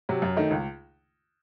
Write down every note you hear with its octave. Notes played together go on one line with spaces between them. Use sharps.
C3 F#3
F#2
D#3 A3 D#4
C#2